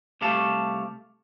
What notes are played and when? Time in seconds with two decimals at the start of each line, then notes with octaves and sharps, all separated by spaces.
0.21 C2 A3 G4 F5 A5